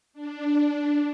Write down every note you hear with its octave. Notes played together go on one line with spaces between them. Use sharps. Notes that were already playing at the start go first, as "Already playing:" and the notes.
D4